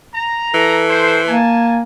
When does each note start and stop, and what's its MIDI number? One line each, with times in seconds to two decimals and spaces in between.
0.14 0.83 82
0.54 1.39 52
0.54 1.20 69
0.90 1.22 72
1.28 1.83 58
1.28 1.81 80
1.28 1.81 81